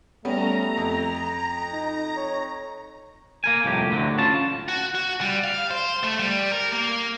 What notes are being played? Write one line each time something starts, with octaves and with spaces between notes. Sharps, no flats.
G3 A3 B3 C#4 A#5
F2
D#4
C#5
A#3 A#4 G#5
C2 F2 A2 G4
D2 A2 D3 F#3
C#4 F4 A5
F#4
F#4
G3
F5
C5
A3
G3
A#4
A#3